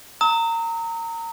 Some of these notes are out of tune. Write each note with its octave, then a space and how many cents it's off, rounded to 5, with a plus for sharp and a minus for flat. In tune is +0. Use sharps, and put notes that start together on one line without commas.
A#5 -25 D#6 +45